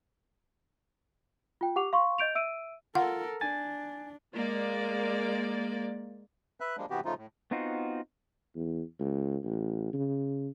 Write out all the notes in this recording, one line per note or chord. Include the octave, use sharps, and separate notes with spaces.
F4 G5
G4 F#5 D6 F7
F5 C6 C#6
D#5 G6 D7 F7
E5 E6 D7 D#7
F4 A4 A#4 F#5
D4 G#5 A6
G#3 A#3 D5
B4 E5 F#6
F3 G3 G#3 A#3 D4
C3 E3 B3 F#4 G4
C#3 F3 A3 D#4 F4
A2
B3 C4 D#4 F4 F#4
E2
C#2
A1
C#3